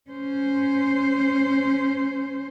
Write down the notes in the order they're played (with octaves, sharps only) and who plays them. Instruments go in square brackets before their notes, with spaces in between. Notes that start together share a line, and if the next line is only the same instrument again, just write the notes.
[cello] C#4 C5